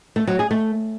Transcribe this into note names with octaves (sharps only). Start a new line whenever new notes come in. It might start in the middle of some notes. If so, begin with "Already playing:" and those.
A3
F#3
G#4
A3